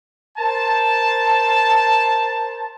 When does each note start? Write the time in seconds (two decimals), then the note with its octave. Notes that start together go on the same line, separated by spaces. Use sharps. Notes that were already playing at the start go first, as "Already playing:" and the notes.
0.38 A#4 C5 A5